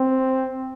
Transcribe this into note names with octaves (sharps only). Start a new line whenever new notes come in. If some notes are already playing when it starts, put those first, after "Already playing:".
Already playing: C4